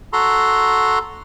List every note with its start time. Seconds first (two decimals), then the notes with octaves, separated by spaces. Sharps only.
0.13 F#4 A4 A#5 C6